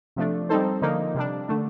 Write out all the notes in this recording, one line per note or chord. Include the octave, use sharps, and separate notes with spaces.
C3 F3 A3 D4
G3 C4 D#4 A4 C5
D3 F3 A#3 D#4
C3 G3 D4
D3 A3 D4